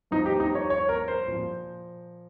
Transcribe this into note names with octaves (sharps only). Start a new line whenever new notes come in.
G2 F3 D#4
G4
D#4
C#5
C#5
A#4
C5
A#2 F3